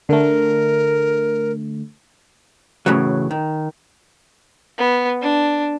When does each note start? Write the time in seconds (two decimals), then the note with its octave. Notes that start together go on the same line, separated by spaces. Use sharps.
0.09 D3 A3 A#4
2.86 F#2 A2 C#3 E3 F#3
3.31 D#3
4.78 B3
5.22 D4